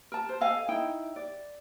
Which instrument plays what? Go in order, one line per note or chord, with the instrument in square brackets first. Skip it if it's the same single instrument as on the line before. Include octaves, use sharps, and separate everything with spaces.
[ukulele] A#4 A5
C5
A4 D#5 F5 G#5
D#4 E4 G5
D5